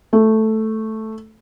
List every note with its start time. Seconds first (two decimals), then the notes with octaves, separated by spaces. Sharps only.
0.13 A3